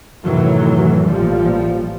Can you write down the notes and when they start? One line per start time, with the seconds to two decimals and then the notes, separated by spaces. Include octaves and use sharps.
0.24 F#2 A2 C3 D#3 E3 F#3
1.05 A1 A#2 F3 G3